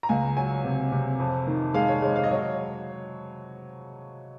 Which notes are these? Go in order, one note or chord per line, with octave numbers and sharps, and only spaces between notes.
A#5
C#2 G#5
F#3 G#5
C3
C3
F2
D#3
G#3 F5
C#5
G#3 C#5
F5
D#5
F#3 C#5